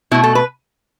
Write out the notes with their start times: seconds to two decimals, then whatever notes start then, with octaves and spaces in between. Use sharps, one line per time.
0.11 B2 A3 E4
0.24 A4
0.35 B4